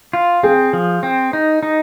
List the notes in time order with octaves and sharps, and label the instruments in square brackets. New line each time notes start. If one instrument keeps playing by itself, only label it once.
[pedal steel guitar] F4
[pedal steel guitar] C4 [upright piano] G#4
[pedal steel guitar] F3
C4
D#4
D#4